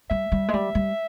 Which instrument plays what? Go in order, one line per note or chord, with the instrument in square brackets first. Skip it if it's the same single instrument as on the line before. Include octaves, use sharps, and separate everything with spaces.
[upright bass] G3 [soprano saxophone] E5
[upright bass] G3
G#3
G3
G3